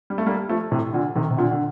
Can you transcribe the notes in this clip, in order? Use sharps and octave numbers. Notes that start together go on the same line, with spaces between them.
G3
A3
G3 A#3
F3 A3
A2 C3
A#2 D3
C3 D#3
C3
A#2 D3
D3